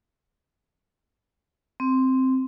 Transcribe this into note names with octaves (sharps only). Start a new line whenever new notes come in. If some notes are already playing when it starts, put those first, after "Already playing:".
C4